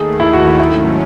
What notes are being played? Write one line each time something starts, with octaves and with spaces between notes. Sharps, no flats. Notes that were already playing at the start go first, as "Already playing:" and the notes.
Already playing: D#2 D#3 A3 G#4
E4
F#4
E4
G#2 F#3 C#4 E4